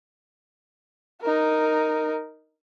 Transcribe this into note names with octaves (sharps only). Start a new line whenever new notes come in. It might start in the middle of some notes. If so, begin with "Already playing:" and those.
D#4 A#4